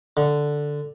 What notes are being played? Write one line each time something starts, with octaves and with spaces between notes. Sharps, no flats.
D3